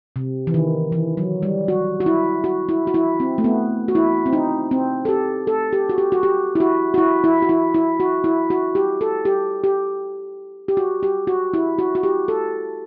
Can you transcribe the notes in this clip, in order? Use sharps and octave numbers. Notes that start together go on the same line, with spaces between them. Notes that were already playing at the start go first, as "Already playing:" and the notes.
C3
E3
D#3
E3
F#3
G3
F#4
F#4
E4
F#4
E4
F#4
E4
C4
A3
B3
F#4
E4
C4
D#4
C4
A4
G4
A4
G4
F#4
G4
F#4
G4
E4
F#4
F#4
E4
E4
F#4
E4
E4
F#4
E4
F#4
G4
A4
G4
G4
G4
F#4
G4
F#4
E4
F#4
F#4
G4
A4